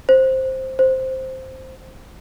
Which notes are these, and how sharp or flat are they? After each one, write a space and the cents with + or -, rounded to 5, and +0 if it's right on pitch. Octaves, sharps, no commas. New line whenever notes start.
C5 +5
C5 +0